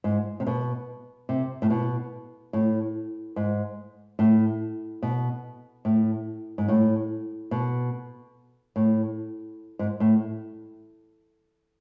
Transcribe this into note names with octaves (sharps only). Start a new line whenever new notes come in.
G#2
C3
B2
C3
A2
B2
A2
G#2
A2
B2
A2
G#2
A2
B2
A2
G#2
A2